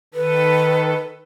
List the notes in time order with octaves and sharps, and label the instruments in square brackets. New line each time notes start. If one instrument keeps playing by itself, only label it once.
[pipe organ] D#3 A4 [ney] B4